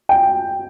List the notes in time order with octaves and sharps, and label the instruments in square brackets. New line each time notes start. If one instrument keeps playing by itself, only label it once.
[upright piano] G5